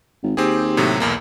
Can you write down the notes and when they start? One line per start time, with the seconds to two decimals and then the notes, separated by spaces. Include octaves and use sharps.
0.23 G#1
0.37 D#2 C4 G4 G#4
0.77 A2 C3 F#3
1.00 B1 E2 A#3